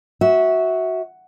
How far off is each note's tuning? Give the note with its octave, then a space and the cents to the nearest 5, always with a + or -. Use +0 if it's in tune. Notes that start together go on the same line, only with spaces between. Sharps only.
F#4 +0 E5 -20